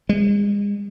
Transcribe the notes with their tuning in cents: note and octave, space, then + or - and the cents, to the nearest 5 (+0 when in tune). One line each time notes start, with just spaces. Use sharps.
G#3 -35